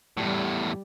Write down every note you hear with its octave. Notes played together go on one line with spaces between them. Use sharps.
E2 A2 G3